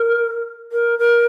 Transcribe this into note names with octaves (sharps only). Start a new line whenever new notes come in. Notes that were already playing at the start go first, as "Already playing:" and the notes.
Already playing: A#4
A#4
A#4